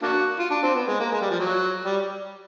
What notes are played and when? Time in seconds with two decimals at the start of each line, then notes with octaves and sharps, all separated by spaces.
0.03 A#3 D4 F#4
0.39 F4
0.51 D4
0.63 C4
0.75 B3
0.88 G#3
1.00 A#3
1.12 G#3
1.21 G3
1.30 F3
1.40 F#3
1.85 G3